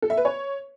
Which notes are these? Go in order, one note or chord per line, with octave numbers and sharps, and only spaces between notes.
A4
E5
B4
C#5